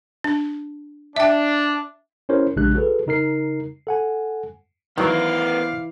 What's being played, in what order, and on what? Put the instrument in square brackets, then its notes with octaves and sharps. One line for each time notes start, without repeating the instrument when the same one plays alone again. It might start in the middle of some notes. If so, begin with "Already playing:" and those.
[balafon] D4
[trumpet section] D4 [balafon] E5 G5
[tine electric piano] C#4 E4 G4 A#4 C5 C#5
A#1 C#3 G#3 D4 G4 F#6
F#4 G#4 A4 B4
C#3 D#4 A#4 C7
A4 F#5 G#5
[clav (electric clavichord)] D#3 F#3 [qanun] E3 [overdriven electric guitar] B3 A#4 [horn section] C5 D5 F5